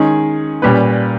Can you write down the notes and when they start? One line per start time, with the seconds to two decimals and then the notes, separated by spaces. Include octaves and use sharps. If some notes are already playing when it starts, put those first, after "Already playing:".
Already playing: D#3 G#3 C#4 G#4
0.62 A#2 G3 C#4 G4 B4